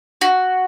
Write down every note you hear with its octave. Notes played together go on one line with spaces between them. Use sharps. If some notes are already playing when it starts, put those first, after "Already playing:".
F#4